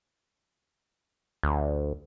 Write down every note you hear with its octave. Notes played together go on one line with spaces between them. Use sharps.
D2